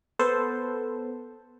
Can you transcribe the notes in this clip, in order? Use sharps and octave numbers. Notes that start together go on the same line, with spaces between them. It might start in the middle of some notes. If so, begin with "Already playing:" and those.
B3 A4 B4 C5